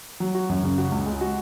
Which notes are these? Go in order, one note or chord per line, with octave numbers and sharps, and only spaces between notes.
F#3
F#4
F#2
C#3
F#4
C#2
G#3
F#4